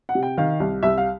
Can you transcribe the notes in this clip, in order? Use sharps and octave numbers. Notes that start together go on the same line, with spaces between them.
F#5
C3
G5
D#3 F5
C2
C2 E5
F5